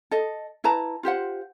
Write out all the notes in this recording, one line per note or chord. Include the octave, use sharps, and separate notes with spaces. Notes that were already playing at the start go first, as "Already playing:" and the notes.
A4 D#5
E4 B4 A5 A#5
F4 G4 C5 F#5